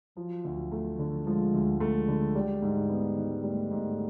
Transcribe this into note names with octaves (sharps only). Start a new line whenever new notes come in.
F3 F#3
D2
A3
D3
F3 G#3
D2
G#3 A3
D3
G3
G#2
B3
D#3
G3 A3
G#2